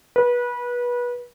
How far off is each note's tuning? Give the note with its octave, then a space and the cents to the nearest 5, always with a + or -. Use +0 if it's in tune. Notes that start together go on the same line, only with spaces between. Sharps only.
B4 -25